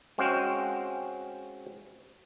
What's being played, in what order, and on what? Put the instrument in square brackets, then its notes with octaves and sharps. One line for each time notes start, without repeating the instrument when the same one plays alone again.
[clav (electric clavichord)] G#3 C4 C#4 F#4 F5 G5